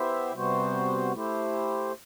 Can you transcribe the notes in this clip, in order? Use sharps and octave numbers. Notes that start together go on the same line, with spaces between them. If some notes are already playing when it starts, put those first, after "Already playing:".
Already playing: B3 E4 G4 C5 E5
C3 G3 B3 F#4 C5
A3 E4 G4 C5